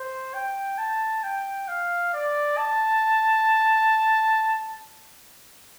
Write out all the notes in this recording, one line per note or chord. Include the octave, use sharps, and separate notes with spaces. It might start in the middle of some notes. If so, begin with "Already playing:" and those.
Already playing: C5
G5
A5
G5
F5
D5
A5